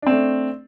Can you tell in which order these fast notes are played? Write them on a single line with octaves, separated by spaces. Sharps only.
D4 C4 A3